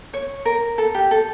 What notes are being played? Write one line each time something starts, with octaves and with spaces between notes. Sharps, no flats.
C#5
A#4
A4
G4
A4